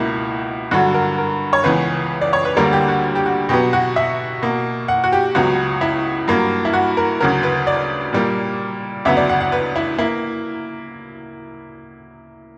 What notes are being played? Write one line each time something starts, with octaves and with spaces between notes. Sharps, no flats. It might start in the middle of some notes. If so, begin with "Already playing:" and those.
Already playing: C#2 B2 A#3 E4
G2 D3 F#3 F#4
A#4
A#4
C#5
C#2 C#3 E3 B3 B4
D5
C#5
B4
D2 D3 G3 A#3 A#4
G4
F#4
G4
F#4
B2 F#3 B3 G4
F#4
E5
B2 A#3
F#5
F#4
G4
C#2 C#3 F#3 B3 F#4
E4
G2 F#3 A#3
E4
F#4
A#4
D2 C#3 F#3 A#4
B4
D5
A#2 G3 A#3
D2 C#3 F#3 B3 E5
D5
F#5
F#5
B4
E4
A#3 E4